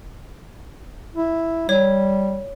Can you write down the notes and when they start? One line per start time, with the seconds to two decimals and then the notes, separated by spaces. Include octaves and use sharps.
1.15 E4
1.69 G3 C#5